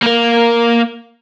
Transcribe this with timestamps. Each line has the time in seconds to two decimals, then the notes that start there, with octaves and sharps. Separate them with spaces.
0.03 A#3 A#4